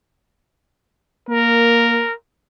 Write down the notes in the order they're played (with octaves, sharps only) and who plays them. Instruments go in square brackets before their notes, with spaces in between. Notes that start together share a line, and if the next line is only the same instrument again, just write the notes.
[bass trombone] A#3 [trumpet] A#4